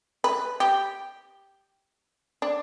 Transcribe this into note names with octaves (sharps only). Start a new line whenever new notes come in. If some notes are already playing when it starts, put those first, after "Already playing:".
B4
G4
D4